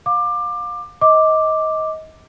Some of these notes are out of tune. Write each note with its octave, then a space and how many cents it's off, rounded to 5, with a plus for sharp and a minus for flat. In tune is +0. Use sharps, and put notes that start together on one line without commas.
F5 +30 D6 +20
D#5 +20 D6 +0